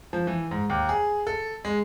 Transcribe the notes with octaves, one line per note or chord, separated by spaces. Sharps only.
F3
E3
G#2
D#2
G#4
A4
G#3